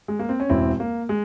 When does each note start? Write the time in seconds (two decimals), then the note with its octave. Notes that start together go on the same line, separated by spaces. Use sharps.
0.08 G#3
0.19 A#3
0.29 C4
0.40 C#4
0.49 E1 E2 E3 C4 E4
0.80 A#3
1.09 G#3